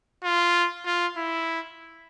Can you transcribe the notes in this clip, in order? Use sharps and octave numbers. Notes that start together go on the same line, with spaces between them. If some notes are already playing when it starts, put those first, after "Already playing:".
F4
F4
E4